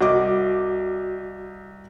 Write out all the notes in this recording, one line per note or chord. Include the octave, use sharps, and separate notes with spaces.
C2 F#4 D#5 D6